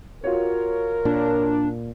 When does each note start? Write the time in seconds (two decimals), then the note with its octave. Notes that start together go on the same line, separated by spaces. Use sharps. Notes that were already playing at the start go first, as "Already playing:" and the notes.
0.24 F4 F#4 A#4 C#5
1.05 A#2 D4